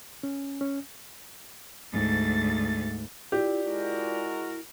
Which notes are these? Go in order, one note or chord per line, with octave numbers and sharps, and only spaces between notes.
C#4
C#4
D2 G#2 A6
E4 F4 G4 D5
G#3 E4 F#4 A#4